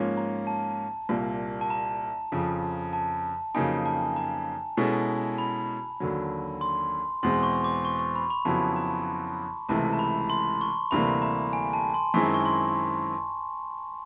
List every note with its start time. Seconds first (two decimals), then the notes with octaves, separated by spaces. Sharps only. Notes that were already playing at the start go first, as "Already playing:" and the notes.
Already playing: G#2 F3 A#3 C#4
0.17 A#5
0.47 A5
1.09 C2 A#2 G3 A#3
1.61 A5
1.70 A#5
2.32 F2 C#3 F3
2.93 A5
3.55 F2 C#3 F#3 A#3 D#4 G#5
3.86 A5
4.16 A#5
4.77 B2 G#3 C#4 E4 A4
5.38 B5
6.00 D#2 D3 F#3
6.61 C6
7.23 E2 B2 G#3 C4 C6
7.34 C6
7.43 C#6
7.64 D6
7.85 C#6
7.99 C#6
8.16 B5
8.30 B5
8.45 F2 C#3 F#3 B3 E4 A5
8.76 A#5
9.69 C#2 C3 E3 A3 A5
9.93 A#5
9.99 B5
10.30 C6
10.61 C#6
10.91 D2 C3 E3 G3 A#3 B5
11.22 A#5
11.53 G#5
11.73 A5
11.94 C6
12.14 F#2 D#3 G#3 C4 E4 C#6
12.34 C#6
12.45 C6